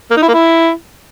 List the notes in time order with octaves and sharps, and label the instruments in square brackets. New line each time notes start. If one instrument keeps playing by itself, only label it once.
[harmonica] A#3
D#4
E4
A#3
E4